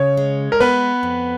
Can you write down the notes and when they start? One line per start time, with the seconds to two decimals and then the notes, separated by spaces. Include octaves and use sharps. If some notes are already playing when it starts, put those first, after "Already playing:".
Already playing: C#3 C#5
0.17 G#3
0.52 A#4
0.60 B3 B4
1.03 F2